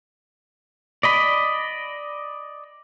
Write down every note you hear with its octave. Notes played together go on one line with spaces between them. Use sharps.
D5 D#5 B5